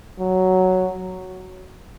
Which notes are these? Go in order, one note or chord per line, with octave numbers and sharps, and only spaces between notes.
F#3